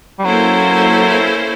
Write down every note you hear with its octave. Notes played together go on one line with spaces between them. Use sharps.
G3
F#3 A#3 C#4 E4 A4 C5